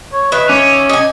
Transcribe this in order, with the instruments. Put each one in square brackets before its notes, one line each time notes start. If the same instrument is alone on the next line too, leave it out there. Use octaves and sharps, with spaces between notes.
[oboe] C#5
[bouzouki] D#3 E5 [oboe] B4
[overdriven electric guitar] C#4 [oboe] D6
[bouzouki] D#4 G#5